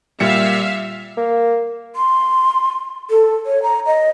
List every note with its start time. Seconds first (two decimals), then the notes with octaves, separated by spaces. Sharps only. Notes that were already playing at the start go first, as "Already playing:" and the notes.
0.20 A#2 G3 E5 F5 C#7
1.17 A#3
1.96 C6
3.10 A4
3.46 C#5
3.63 A#5
3.86 D#5